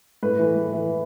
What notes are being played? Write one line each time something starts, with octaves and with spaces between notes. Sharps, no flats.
A2 B4
E3
A2
E3